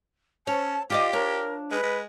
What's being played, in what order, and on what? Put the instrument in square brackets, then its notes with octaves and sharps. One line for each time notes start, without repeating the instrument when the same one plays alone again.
[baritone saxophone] C#4 [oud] C#5 [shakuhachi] A5
[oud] F4 D5 D#5 [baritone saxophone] G4 [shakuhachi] D6
[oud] D4 C#5 [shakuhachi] A#4
[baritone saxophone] G#3 [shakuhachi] B4
[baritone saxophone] G#3